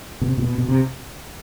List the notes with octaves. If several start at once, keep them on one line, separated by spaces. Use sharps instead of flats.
B2
C3
A#2
B2
B2
C3